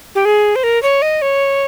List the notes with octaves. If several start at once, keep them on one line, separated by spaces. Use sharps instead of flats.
G4
G#4
C5
A#4
C#5
D#5
C#5